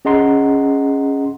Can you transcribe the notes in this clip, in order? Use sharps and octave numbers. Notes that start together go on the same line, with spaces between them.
C#4 G#4 D#5 F#5 A#5 C6